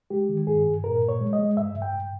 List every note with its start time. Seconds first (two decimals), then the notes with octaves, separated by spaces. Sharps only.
0.10 G#3 G4
0.29 D#3
0.47 G2 G#4
0.66 G2
0.84 A#2 A#4
1.02 A#2
1.09 C#5
1.21 G#3
1.33 D#5
1.39 G#3
1.57 G2 E5
1.76 G2
1.82 G5
1.94 G2